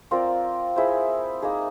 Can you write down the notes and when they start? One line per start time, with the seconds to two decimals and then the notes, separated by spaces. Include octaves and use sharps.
0.11 C4 F4 A#4 D5
0.76 E4 G#4 C5
1.42 A#3 D#4 G#4